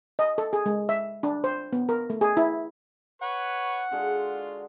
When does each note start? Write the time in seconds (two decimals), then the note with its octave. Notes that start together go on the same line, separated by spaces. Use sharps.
0.19 D#5
0.38 A4
0.53 G#4
0.66 G#3
0.89 E5
1.23 D4
1.44 C5
1.73 B3
1.89 A#4
2.10 A3
2.21 G#4
2.37 E4
3.22 B4 C#5 F#5 C#6
3.91 D3 G#3 F4 F#4